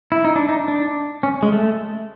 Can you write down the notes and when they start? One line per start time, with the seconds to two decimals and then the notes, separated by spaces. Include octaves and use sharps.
0.12 E4
0.25 D#4
0.36 D4
0.49 D#4
0.68 D4
1.23 C#4
1.43 G#3
1.52 A3